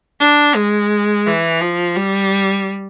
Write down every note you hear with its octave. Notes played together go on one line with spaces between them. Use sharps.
D4
G#3
E3
F3
G3